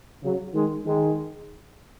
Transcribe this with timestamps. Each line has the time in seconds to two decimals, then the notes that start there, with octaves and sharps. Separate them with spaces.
0.24 C#3 F#3
0.54 D#3 G#3
0.85 D#3 G#3